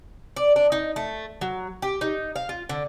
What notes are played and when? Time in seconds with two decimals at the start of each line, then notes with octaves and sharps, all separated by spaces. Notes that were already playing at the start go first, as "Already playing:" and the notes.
0.36 D5
0.56 D4
0.72 D#4
0.96 A3
1.41 F#3
1.82 G4
2.01 D#4
2.36 F5
2.49 F4
2.69 D3